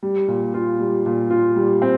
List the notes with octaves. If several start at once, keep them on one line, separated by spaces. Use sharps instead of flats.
G3
A#2
F4
G3
A#2
F4
G3
C4